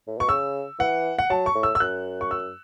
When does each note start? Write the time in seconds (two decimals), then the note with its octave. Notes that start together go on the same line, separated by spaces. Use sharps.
0.07 A2
0.18 B2 C#6
0.29 C#3 E6
0.79 E3 F#5
1.19 F#5
1.30 F#3 A5
1.46 C#6
1.55 A2
1.63 E6
1.75 E6
1.80 F#2 F#6
2.21 C#6
2.31 E6